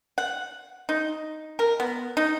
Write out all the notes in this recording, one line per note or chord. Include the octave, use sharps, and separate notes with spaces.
F#5
D#4
A#4
B3
D#4